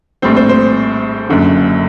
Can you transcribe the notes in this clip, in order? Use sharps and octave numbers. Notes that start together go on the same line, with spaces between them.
A#1 A2 G3 C4 C5
C5
C5
F#1 F#2 D3